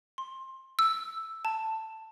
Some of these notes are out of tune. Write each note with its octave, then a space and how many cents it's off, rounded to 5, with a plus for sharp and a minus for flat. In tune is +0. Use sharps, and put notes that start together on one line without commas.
C6 +20
E6 +0
A5 +10